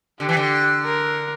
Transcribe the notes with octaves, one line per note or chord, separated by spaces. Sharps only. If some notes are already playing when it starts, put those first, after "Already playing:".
D3 G4
E3
D3
A#4